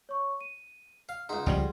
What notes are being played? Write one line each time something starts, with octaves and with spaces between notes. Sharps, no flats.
C#5 C#6
D#7
F5
C#2 D#4 G#4 F#5 C6
C#2 C#3 F3 G3